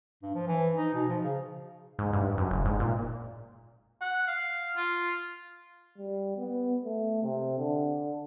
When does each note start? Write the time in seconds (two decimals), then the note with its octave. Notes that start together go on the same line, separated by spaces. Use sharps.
0.22 G2
0.35 F3
0.48 E3
0.76 D#4
0.94 B2
1.09 F3
1.24 C#3
1.99 G#2
2.13 G2
2.38 F#2
2.51 F#1
2.65 G#2
2.80 A#2
4.01 F#5
4.28 F5
4.77 F4
5.98 G3
6.37 B3
6.85 A3
7.23 C3
7.59 D3